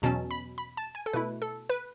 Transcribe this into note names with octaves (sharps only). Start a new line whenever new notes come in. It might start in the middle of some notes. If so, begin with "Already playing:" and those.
E2 B2 F#3 C#4 A5
B5
B5
A5
G#5
A4
B2 A3 E4 B4
A4
B4